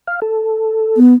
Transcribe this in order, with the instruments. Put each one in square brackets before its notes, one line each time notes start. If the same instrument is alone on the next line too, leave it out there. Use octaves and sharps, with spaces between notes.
[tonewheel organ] F5
A4
[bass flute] B3